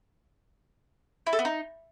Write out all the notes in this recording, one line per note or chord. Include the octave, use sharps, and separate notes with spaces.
E4
A4
B3
D#4